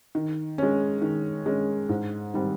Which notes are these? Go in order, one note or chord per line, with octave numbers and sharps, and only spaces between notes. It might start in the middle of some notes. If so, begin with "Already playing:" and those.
D#3
G#3 C#4
D#3
G#3 C#4
G#2
D#3 G3 C4